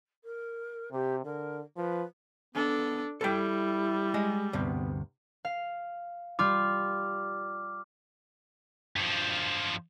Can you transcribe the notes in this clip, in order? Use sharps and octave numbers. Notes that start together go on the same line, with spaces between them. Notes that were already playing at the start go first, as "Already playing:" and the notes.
A#4
C3 G4
D3 A#4
F3 B4
B3 D4 A4
G3 E4 A4 G5
G#3 D#5
D2 G2 C3 B3
F5
G3 F4 D6 F6
G2 F3